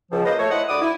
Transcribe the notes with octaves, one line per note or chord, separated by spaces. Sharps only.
C#2 F3
A#3 F4 B4 C5 D#5
A3 C#5
E4 C5 D#5 F#5
D2 F#4 D5 B5 D6 D#6
E4